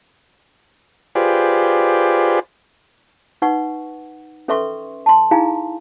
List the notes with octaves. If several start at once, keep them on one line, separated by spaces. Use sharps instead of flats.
F4 G4 G#4 B4 C5 D5
D#4 B4 F#5 C#6
C#4 A4 B4 E5 C6 C#6
A5 C6
D#4 E4 G#4 F5 G#5 A#5